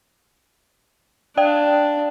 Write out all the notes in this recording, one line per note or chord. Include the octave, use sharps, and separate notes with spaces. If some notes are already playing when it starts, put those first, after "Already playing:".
D4 D5 F5 G5